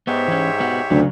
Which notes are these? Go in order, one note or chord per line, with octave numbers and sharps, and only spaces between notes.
G#2 B3 G4 C#5 E5
E3 C#4
B3 F#4
D2 A#2 C#3 F#3